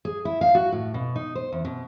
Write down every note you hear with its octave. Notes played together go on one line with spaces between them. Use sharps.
G#4
E4
F5
F#4
A2
B2
D#4
C5
E2
B2